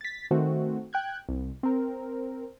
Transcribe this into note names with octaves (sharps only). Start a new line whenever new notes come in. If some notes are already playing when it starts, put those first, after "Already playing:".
A6 B6
D#3 A3 C4 F#4
G5 F#6 G#6
C2
C4 A#4